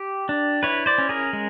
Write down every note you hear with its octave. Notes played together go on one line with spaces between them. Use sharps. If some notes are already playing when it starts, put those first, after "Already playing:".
Already playing: G4
D4
E4 B4 C#5
C5 D5
C#4
G#4 A#4
G#3